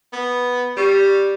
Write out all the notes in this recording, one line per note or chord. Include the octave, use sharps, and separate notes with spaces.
B3
G3 G4 C#6